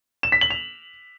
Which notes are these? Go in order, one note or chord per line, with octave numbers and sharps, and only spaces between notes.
E7
B6
F#7
F7